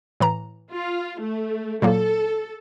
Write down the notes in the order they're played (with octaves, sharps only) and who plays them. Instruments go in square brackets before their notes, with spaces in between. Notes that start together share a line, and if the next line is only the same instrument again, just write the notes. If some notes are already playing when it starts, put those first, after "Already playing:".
[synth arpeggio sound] A2 E3 A#5
[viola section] F4
A3
[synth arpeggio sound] A#2 F#3 A#3 [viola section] A4